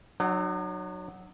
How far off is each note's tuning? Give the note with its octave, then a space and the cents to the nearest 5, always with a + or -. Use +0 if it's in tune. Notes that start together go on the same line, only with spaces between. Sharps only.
F#3 +0 D#4 -45 F#5 +40